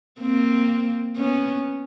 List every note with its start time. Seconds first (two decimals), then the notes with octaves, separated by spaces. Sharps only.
0.21 A#3 C4
1.17 B3 C#4